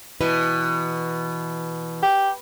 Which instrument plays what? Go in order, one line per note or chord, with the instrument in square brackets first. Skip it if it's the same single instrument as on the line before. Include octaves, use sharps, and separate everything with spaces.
[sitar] B2 [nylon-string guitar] E3 E4 B4
[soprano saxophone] G4